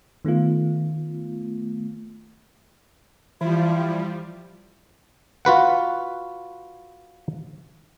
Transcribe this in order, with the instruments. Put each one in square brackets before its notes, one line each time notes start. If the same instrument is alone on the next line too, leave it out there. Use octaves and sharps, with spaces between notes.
[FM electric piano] D#3 A3 B3 F4
[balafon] E3 [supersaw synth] F3 G3 [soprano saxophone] E4 [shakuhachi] F4
[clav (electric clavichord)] F4 F#4 B4 F#5